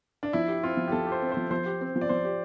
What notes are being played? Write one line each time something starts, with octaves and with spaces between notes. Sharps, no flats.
D4
F3 E4
G4
C4 F4
F3
G4
F3 A4
G4
C5
C4
C5
F3
F3 C5
G4
C4
F3
D5
F3 C5
G4